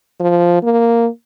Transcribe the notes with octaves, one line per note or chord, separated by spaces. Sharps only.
F3
A#3